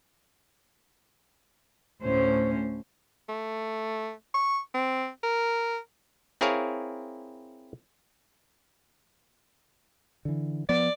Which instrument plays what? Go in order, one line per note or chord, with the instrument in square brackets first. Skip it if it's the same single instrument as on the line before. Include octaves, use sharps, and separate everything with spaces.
[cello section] D2 A2 C#4 C5
[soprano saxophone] A3
C#6
C4
A#4
[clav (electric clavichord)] C4 E4 G#4 A#4 C#5 F5
[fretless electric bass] D3 E3
[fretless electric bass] F3 B3 [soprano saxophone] D5